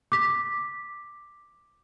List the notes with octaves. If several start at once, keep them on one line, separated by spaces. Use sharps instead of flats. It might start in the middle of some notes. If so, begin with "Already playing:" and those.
D6 B6